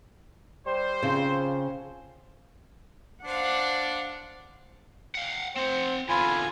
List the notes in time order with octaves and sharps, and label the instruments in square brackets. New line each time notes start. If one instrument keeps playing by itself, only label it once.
[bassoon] G3 [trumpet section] C5
[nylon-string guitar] C#3 C4 [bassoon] F3
[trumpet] D4 [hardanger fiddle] C5 F5 [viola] F#5
[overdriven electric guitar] F5 F#5
[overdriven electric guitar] C4 F#5 [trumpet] C5
[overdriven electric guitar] E2 D3 [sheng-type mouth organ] F4 G#5 [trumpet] B5